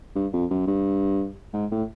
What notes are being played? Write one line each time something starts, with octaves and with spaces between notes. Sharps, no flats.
G2
F2
F#2
G2
G#2
A2